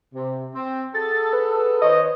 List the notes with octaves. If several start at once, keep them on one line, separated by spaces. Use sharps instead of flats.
C3
C4
F#4 G#4 A4 A6
B4
D#3 C5 C#5 D#5